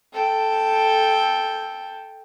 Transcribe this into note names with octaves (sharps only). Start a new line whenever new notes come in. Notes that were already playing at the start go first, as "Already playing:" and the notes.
A4 G5